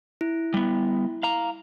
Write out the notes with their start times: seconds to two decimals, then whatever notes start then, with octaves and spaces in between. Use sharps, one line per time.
0.21 E4
0.54 G3 B3
1.23 F5 A#5